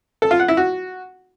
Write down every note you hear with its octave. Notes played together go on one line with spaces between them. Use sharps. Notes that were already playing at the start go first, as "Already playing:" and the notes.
A4
F4
F#5
E4
F#4